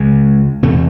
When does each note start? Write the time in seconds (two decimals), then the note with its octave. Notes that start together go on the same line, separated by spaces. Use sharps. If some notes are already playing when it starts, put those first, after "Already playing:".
Already playing: C#2 C#3 G#3
0.63 E2 C3 A3